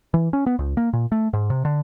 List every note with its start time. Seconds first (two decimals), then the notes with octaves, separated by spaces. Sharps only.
0.14 E3
0.33 C#4
0.46 B3
0.59 C#2
0.77 A#3
0.93 A#2
1.12 A3
1.33 G#2
1.50 C3
1.65 D3